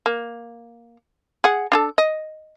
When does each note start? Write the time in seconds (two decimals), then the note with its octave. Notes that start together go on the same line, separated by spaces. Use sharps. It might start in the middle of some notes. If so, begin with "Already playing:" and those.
0.06 A#3
1.44 G#4 F#5
1.72 D4 G#4 A4
1.98 D#5